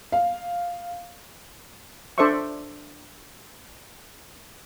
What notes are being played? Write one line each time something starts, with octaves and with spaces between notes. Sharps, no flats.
F5
D4 A4 C5 D5 E5 C#6